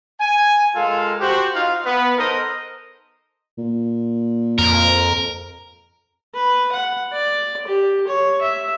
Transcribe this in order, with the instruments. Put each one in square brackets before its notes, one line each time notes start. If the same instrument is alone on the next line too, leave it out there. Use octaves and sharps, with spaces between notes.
[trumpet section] G#5
G#3 F4 A4 A#4 F5
F#4 G4 C5
D#4 F4 F5
B3 B4
D#4 A4 A#4 C5 D#5
[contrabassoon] A#2
[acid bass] F2 [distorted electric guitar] A#4
[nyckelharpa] B4
F#5
D5
G4
C#5
E5